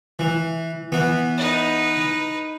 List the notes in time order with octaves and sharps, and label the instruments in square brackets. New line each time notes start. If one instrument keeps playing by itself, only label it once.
[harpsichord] E3
E3 B3
[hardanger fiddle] D#4 B4